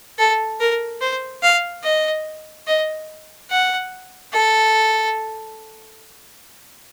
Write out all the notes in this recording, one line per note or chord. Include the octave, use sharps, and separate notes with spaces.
A4
A#4
C5
F5
D#5
D#5
F#5
A4